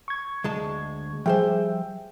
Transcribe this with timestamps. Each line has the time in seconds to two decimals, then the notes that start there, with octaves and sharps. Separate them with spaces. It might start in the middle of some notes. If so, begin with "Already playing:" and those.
0.08 C#6 G#6
0.44 D2 G#3 A5
1.26 F3 G3 G#4 C5 E5 G5